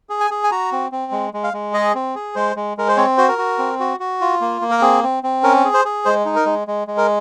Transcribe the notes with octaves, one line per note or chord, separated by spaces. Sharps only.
G#4
G#5
G#4
G#5
F#4 A#5
C4
C4
G#3
G#3
F5
G#3
G#4 D#5
C4
G#4
G#3 C5
G#3
G#3 A#4
C5
C4 C#5
F#4 C5
A#4
F#4
C4
F#4
F#4
F4
A#3
A#3
A#4
C4 G#4
C4
C4
C#4 A#4
G#4
C5
G#4
G#3 C5
D#4
A#4
G#3
G#3
G#3
A#4